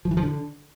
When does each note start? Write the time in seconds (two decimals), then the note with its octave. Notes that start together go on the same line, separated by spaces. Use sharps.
0.05 F3
0.11 E3
0.17 F3
0.23 D3